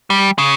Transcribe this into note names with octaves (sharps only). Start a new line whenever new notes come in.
G3
C#3